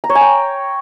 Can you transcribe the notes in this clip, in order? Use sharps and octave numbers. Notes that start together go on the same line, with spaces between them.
A#5
C#5
G#5
G5